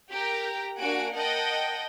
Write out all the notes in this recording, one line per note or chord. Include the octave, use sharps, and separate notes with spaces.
G4 A#4 G5 A#5
A#3 D4 F#4 F#5 G#5 D7
A#4 D#5 F#5 G5 A5